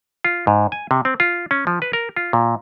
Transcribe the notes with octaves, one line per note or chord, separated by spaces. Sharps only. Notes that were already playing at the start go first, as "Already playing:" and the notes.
F4
G#2
G#5
C3
C4
F4
C#4
F3
B4
A#4
F4
A#2